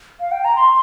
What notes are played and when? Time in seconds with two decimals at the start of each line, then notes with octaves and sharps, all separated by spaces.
0.20 F5
0.32 G5
0.45 A#5
0.56 C6